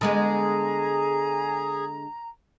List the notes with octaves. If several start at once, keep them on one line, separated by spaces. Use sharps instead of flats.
D3 G#3 B3 G#4 A#5